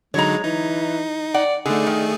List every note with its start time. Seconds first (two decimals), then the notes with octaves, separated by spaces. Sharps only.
0.14 D3 F#3 G#3 D#4 C#5 A#5
0.44 E3 D#4
1.34 D5 F#5
1.66 D3 A3 D#4 G#4
1.87 D#3